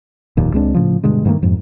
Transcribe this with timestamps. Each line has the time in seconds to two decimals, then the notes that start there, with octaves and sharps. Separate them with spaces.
0.37 F1 D#2 A#2
0.53 C#2 G#3 C4 D4
0.74 A2 C#3 F3
1.04 G2 B2 D3 G#3
1.25 G2 D#3 A3 A#3
1.42 F2 G#2